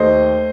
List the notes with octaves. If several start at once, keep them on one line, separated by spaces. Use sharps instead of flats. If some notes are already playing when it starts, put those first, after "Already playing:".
Already playing: D#2 A3 C5 D#5